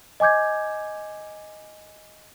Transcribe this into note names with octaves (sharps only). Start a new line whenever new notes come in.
D#5 G#5 D6 G6 G#6